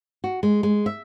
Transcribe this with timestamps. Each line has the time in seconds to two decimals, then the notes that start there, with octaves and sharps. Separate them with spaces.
0.24 F#4
0.43 G#3
0.63 G#3
0.86 E5